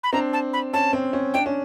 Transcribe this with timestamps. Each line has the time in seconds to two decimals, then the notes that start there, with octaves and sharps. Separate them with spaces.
0.04 B5
0.13 C4 D4 A#5
0.33 A5
0.53 B5
0.73 C#4 A5
0.93 C4
1.13 C#4
1.34 D4 G5
1.46 C#4